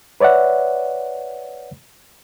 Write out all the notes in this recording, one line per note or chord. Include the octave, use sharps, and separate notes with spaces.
B4 C#5 D5 E5 F#5